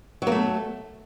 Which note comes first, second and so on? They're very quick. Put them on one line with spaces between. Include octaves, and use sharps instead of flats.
F#3 A#3 A3